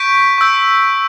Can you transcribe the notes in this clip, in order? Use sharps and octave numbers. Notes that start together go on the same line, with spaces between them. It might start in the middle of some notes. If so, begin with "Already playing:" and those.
Already playing: C#6 G6 B6 D7
C#6 E6 G6